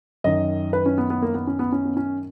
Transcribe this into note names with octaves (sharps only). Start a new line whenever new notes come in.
F#2 D#3 D#5
B4
C#4
B3
B3
A#3
B3
C#4
B3
C#4
B3
C#4